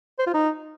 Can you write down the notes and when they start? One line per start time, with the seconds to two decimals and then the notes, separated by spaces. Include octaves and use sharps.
0.19 C5
0.26 F4
0.34 D#4